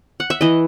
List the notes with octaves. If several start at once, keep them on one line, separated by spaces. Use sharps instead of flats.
F#5
E5
E3 D#5